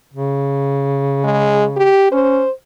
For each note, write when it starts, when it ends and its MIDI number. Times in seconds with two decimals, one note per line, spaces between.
0.13 1.88 49
1.24 1.65 56
1.77 2.09 67
2.12 2.43 61
2.12 2.51 72